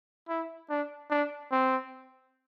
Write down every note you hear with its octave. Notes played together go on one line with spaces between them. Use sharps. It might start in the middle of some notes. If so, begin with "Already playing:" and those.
E4
D4
D4
C4